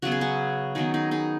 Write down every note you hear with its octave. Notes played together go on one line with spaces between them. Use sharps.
C#3 F#3 B3 F#4
G#4
C#4 F#4
D#3 F#3 B3 D#4 G#4
D#4 G#4
D#4 G#4